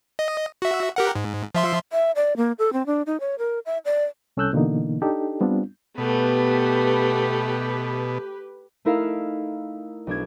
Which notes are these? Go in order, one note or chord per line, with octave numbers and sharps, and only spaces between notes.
D#5
F#4 E5
G4 A#4 F#5
G#2
F3 E5 C6
E5
D5
A#3
A4
C4
D4
D#4
C#5
A#4
E5
D5
C2 C#4 A4 E6 F#6 G6
B2 D3 E3 A#3 D#4
D4 D#4 G4 A4
G3 B3 C4 D4 F4
B2 A3 B3 G4 B4
A3 D#4 E4 A#4 E5 F5
B1 D4 G#6